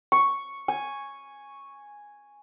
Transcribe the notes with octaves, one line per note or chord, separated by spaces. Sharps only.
C#6
G#5